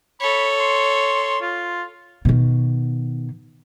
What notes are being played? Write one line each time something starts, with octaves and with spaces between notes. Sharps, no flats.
A4 C#5 B5
C6
F4
B2 D#3